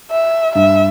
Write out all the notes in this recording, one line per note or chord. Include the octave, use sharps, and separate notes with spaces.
E5
G2 E5